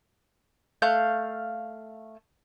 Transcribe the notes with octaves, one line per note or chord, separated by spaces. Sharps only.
A3 F5 F#6 G6